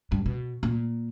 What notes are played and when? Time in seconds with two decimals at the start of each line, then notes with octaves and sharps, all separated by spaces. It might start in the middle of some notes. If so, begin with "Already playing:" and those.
0.12 G2
0.26 B2
0.63 A#2